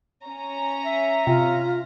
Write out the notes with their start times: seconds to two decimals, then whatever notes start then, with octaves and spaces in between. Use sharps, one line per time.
0.27 C#4 A#5
0.85 E5
1.27 C3 F4